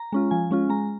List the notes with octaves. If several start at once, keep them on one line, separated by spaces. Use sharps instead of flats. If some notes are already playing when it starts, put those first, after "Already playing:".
Already playing: A#5
G#3 C#4 F4
F3 G#5
G#3 C#4 F4
G#3 A#5